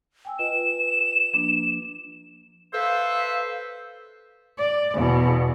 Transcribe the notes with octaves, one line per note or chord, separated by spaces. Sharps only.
G5 G#5 E6
F4 B4 D#5 E7
F3 A#3 D4
A4 B4 C5 E5 F5
D5
E2 B2